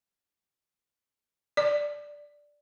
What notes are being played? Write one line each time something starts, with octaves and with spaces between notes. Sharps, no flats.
D5